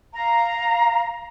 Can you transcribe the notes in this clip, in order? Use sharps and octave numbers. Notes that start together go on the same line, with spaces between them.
F5 A#5